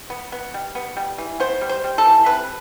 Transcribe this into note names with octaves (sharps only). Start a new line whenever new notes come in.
B3
B3
G3
B3
G3
E3
B3 C5
G3
C5
G3
A4
E3
C3 B4